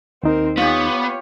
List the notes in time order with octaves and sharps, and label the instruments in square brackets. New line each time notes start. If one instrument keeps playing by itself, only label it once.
[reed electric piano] D#2 D#4 [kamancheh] C4 A#4
[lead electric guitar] B3 [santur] F4 G4 [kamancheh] C#5